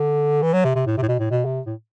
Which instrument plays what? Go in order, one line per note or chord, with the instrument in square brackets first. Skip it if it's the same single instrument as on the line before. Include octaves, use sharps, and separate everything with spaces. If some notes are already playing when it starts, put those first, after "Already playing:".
Already playing: [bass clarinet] D3
E3
F#3
C3
C3
A2
C3
A2
B2
A2
B2
C3
A2